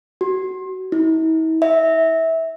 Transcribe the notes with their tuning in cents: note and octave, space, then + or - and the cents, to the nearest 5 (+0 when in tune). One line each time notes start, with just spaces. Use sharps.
F#4 +30
E4 -45
E5 -20